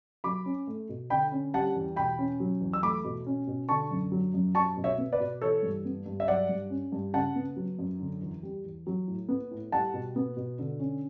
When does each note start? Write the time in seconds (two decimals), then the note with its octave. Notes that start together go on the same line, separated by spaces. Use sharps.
0.24 F#3 B5 D6
0.46 C#4
0.67 A3
0.89 B2
1.10 D3 G5 B5
1.32 C#4
1.54 G3 F#5 A5
1.75 E2
1.96 B2 G5 B5
2.19 C#4
2.40 F#3
2.61 E2
2.73 E6
2.83 A3 B5 D6
3.04 B2
3.26 C#4
3.47 B2
3.69 D3 A5 C#6
3.91 F#2
4.12 F#3
4.34 F#2
4.55 F#3 A5 C#6
4.77 B2
4.84 C#5 E5
4.98 B3
5.12 B4 D5
5.20 B2
5.42 E3 A4 C#5
5.63 G2
5.85 B3
6.06 G2
6.20 E5
6.27 F#3 D5 F#5
6.49 G2
6.70 C#4
6.92 G2
7.13 C#3 F#5 A5
7.36 B3
7.57 F#3
7.79 F#2
8.00 D3
8.21 E2
8.43 G3
8.65 E2
8.87 F#3
9.07 A2
9.29 B3
9.51 A2
9.72 G3 F#5 A5
9.94 B2
10.16 B3
10.37 B2
10.59 D3
10.80 C#4